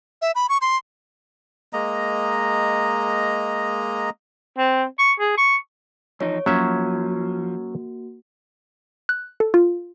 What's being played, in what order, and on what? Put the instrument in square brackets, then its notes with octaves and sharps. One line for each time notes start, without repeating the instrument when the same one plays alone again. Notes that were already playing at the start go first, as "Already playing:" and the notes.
[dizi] E5
B5
C#6
C6
[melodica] G#3 A#3 D#5 A#5
[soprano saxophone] C4
C#6
G#4
C#6
[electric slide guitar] E2 F3 D#4 [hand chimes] C#5
[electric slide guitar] F3 [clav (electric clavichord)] F#3 C#4 E5 [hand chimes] A#3 F#4
[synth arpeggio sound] F#6
A4
F4